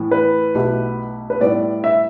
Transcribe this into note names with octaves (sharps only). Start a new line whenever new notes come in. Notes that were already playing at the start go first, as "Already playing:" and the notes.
Already playing: A2 E3 B3
B4
B1 B2 A3 E4 G4
B4
A2 G3 B3 E4 D5
E5